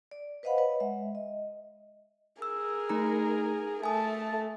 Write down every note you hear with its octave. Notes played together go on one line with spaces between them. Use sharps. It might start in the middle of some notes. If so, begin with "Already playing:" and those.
D5
B4 C5 D#5 F5 F#5 B5
B4 C#5 D#5 F#5
G#3 E5
D#5
G#4 A#4 E6
A3 D#4 A#5
A3 G#5 A5 D#6